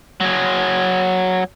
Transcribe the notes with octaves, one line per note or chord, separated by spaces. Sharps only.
F#3 G#4